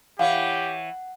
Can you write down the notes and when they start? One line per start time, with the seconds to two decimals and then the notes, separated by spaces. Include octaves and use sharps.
0.19 E3 G4 C#5 F5 F#5